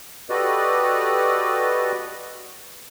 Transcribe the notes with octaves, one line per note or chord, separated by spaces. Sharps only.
F#4 G4 A4 B4 D5 D#5